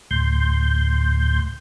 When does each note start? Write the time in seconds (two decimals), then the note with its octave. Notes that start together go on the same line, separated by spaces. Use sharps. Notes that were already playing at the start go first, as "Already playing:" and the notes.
0.11 D2 A2 C6 G6